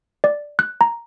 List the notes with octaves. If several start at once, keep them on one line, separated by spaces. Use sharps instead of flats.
D5
F#6
A#5